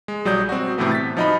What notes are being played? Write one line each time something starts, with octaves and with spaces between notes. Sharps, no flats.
G#3
B1 F#3 G3 D5 D#6 G6
C4 F#4
A2 C3 E3 A3 B3
A6 B6
F3 F#3 D#4 D#5 A#5 B5